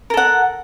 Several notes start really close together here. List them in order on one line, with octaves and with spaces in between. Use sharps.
A#4 A4 F#5